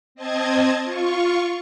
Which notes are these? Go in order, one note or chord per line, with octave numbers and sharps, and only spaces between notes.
C4 D#5 A5 G#6
F4 C#6